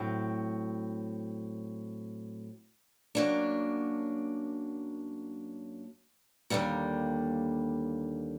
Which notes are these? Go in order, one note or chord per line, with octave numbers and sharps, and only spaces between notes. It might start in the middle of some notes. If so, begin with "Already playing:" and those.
Already playing: A2 F#3 C4
F#2 F#3 A#3 D4
D#2 D3 G3 A#3